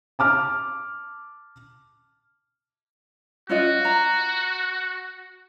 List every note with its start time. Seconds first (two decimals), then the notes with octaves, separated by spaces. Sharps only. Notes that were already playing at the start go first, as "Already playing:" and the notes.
0.19 A5 D6 F6
3.50 C#4 F4 F#4 D#5
3.85 A#5